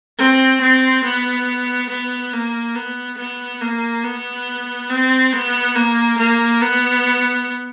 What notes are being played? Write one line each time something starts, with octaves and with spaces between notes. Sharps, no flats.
C4
C4
B3
B3
A#3
B3
B3
A#3
B3
C4
B3
A#3
A#3
B3